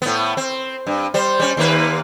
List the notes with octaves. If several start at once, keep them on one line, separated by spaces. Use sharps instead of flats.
A2 B3
C4
G2
G3 C5
G3 C#4
D#2 A#3 B4